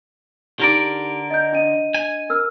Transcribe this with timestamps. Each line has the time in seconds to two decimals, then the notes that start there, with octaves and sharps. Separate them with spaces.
0.60 D3 D#4 G4 A#4 D5
1.30 D#5 G6
1.52 D4 D#5 D#7
1.94 G#5
2.30 A#4 E6 F6